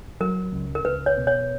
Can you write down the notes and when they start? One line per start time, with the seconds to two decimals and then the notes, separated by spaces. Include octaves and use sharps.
0.20 F#3 A#4
0.52 C#2
0.75 A#4
0.84 C#2 B4
1.06 C#5
1.17 B2
1.27 C#5